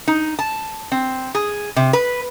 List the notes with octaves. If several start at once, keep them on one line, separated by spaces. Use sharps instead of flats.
D#4
A5
C4
G#4
C3
B4